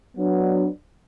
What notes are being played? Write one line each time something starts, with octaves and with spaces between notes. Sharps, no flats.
F#3 B3 D4